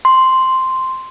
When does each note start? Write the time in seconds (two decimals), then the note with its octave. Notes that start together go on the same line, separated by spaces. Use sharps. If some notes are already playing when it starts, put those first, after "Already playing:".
0.05 C6